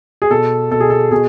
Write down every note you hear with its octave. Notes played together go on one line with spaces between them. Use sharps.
G#4
B2 A4
B2 A4
G#4
A4
B2 G#4